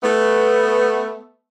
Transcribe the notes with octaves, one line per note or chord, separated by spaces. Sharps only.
A3 B3